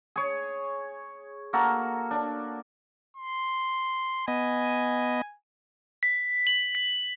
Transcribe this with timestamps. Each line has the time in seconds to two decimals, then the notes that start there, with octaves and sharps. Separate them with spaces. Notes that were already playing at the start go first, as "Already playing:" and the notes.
0.16 G#4 C#5
1.53 A#3 F#4 A4 A#4
2.11 D4
3.17 C6
4.28 B3 D#5 G#5
6.03 B6
6.47 F#7
6.75 B6